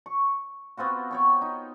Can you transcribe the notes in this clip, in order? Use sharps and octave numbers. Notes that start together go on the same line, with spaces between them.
C#6
B3 C4 F4 F#4
C#5 G5 C#6
D#4